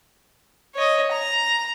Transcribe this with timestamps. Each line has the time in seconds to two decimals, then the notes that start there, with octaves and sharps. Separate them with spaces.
0.75 C#5 D#5
1.11 A#5